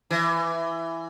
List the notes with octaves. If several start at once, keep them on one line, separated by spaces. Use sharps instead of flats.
E3